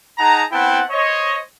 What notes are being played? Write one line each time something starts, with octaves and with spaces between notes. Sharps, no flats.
D#4 G#4 F#5 A5 A#5
B3 C4 E4 F#5 G5 A5
C5 C#5 D#5